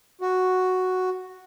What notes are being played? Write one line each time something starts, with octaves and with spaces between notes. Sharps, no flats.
F#4